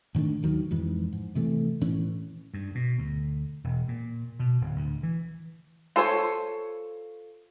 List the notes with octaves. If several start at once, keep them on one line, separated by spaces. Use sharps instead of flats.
G#2 D#3 A3 D4
G#1 D#2 D#3 F#3
F2 G#2 E3
G#2
C3 E3 A3
A2 E3 C#4
G2
B2
D2
E1
A#2
B2
D1
D2
E3
F4 A4 C5 C#5